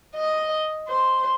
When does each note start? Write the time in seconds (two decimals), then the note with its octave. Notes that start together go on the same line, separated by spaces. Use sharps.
0.15 D#5
0.88 C5